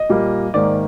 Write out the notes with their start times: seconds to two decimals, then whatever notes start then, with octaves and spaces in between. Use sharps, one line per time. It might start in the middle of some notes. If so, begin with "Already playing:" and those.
Already playing: D#5
0.09 A#2 G3 A#3
0.54 G#2 D#3 A#3 D5